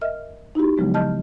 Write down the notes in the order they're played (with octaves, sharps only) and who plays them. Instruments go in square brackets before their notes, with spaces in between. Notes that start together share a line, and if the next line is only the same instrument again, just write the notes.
[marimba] A#4 D#5 E5 F6
D#4 E4 F#4 G4
C#3 F3 F#3 G#3 B3
D#5 A5 F6 G6